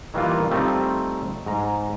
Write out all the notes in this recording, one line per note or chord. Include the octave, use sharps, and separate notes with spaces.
D#3 E3 G3 A#3 F4
G3 A3 C4 D#4 F4
G#2 A#5